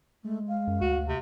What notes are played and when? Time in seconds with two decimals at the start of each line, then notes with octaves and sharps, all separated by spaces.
0.24 G#3 A3
0.48 F5
0.67 F#2
0.81 D2 F#4
1.08 C3